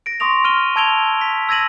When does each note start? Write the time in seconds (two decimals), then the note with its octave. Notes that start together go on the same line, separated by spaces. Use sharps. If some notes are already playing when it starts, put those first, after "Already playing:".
0.06 A#6 D7
0.20 C6 C#6 D#6 A#6 F7
0.45 F6 D#7 G7
0.76 A5 E6 G#6 D7 F7 G7
1.21 B6
1.49 E6 G#6 A#6 D#7 F#7